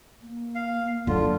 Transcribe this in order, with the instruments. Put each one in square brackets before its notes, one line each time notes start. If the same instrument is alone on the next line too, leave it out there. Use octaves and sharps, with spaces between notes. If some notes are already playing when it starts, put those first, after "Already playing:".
[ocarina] A#3
[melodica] F5
[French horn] D3 [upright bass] F#3 D#4 [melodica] F4